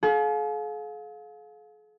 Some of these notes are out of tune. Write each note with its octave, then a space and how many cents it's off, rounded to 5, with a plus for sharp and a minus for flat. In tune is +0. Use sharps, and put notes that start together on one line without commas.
G#4 +45 F5 +25